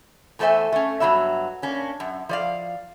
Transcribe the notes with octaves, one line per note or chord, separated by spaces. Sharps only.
E2 A3 A4 C5 E5 G#5
A3 C#4
G2 F#3 G3 B3 E5
A#3 C#4 D4
F#2
F3 D5 F5